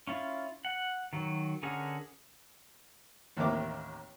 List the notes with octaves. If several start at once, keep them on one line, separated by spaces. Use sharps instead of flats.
C#4 E4 F4
F#5
D#3 F#3
D3 C#4 G#4 A#4 F#5
A1 D#2 C3 E4 A#4 D6